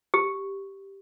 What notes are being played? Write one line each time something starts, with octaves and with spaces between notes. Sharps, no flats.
G4